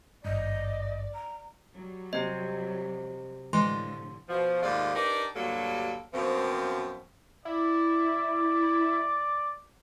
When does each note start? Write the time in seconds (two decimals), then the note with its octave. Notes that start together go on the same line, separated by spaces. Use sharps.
0.25 G#1 G2 D5 D#5
1.14 A#5
1.74 F#3 G3
2.13 C3 C4 D#5
3.53 A2 D3 E3 F3 G#3 C6
4.29 B2 F3
4.62 D#2 G#2 A3 F4 D5
4.95 D4 D#4 G4 A#4 B4 D5
5.36 D2 G2 F#3 G3 A#3 A4
6.14 F#2 B2 F3 A#3 C4
7.45 E4 D5